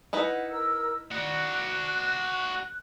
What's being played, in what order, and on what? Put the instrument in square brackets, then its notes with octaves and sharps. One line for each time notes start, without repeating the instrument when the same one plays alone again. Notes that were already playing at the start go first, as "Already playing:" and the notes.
[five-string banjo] D#4 E4 B4 [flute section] F#5
[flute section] A#4 E6
[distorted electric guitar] F#4 D5 [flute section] F#6